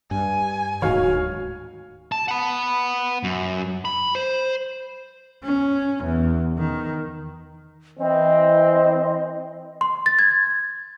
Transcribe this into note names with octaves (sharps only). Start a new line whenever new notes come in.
G2 G#5
D1 G#2 D#3 F#4 C#5 F5 F6
A5
F#5 B5
F#2
B5
C5
C#4
E2
D#3
E3 C4 D#5
C6
A6
G#6